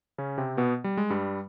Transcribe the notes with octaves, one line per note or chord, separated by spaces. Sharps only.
C#3 C#4
C3 C4
B2 B3
G3
G#3
G2 G3